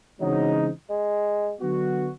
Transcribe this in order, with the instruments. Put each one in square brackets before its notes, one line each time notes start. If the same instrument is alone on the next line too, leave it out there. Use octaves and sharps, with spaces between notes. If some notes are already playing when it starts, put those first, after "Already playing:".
[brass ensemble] C#3 E3 G#3 C4 D#4 [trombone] F#3
[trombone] G#3
[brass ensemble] D3 F#3 B3 D4 F#4